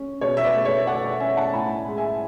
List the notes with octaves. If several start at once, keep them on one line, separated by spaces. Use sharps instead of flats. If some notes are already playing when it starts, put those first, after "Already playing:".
Already playing: C#4
B2 C#5
E5
B4 D5
A3
C#5 E5
B2 D5 F#5
D5 F#5
C#4 E5 G#5
F#5 A5
A2 G#5 B5
G#3
E5 G#5